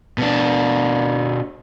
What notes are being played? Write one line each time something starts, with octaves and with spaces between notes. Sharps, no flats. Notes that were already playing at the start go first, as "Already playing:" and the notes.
B2 D4